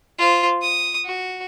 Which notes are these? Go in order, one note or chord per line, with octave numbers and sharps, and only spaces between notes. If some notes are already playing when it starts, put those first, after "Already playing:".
F4 C5
D#6
F#4